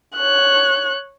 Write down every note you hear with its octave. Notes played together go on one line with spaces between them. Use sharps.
C#5 F#6